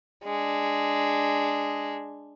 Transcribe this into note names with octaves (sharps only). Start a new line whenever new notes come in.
G#3 D4